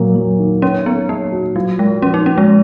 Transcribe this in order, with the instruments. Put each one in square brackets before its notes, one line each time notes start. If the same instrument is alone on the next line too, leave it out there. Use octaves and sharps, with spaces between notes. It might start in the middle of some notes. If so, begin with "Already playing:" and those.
Already playing: [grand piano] A#2 F#3 A#3
F#3
D#3
[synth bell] C#4 [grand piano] C#5
[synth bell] B3 [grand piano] C#5
[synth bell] A#3 [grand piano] C#5
[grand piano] F#4
[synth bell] F#3 [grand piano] F4
[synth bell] G#3 [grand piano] A#4
[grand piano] F3 [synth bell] C#4
[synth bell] D#4
[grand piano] A#3 [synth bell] C#4
[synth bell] G#3